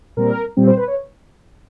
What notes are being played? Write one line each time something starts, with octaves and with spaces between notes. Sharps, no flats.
A#2 G3 C4 A#4
A#2 G3 C4
C5
B4
C#5